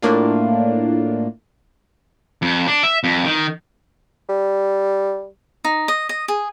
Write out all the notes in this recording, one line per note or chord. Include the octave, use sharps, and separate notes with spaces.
A2 A#3 D4 F4
F2
D4
E5
F2
D#3
G3
D#4
D#5
D#5
G#4